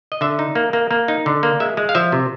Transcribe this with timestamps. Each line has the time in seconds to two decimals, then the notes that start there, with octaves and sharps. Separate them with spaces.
0.12 D#5
0.21 D3 E5
0.39 D#4
0.55 A#3
0.73 A#3
0.91 A#3
1.08 D#4
1.26 D3
1.43 A#3
1.60 G#3 E5
1.77 G#3
1.89 F5
1.95 F3 E5
2.12 C3